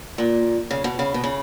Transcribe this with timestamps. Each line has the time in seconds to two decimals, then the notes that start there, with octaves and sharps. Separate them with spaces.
0.18 A#2
0.71 C#3
0.84 B2
0.99 C#3
1.14 B2
1.24 C#3